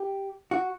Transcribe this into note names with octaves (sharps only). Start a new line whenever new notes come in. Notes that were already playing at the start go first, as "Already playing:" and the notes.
Already playing: G4
F#4